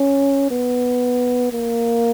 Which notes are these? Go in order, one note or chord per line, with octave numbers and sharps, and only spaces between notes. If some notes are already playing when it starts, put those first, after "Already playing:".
Already playing: C#4
B3
A#3